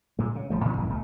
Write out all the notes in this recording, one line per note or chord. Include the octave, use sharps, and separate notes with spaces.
A#2 G#3
C#3
D#1 F3 A3
A2 D#3 F3 C#4
D#1 F#2 E3 A#3
D1 C#2 B2 A3